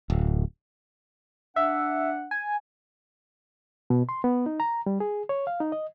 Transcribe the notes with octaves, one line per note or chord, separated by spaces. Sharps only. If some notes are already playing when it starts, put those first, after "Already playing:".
D1
D4 E5 F#5
G#5
B2
C6
B3
D#4
A#5
G3
G#4
C#5
F5
D#4
D#5